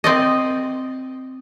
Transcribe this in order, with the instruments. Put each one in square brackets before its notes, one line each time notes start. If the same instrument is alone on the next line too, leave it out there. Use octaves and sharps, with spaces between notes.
[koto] C4 D5 D#5